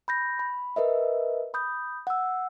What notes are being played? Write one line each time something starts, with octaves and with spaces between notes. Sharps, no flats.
B5 G6 A#6
B5
A#4 B4 D#5 E5
B5 D#6 G6
F#5 E6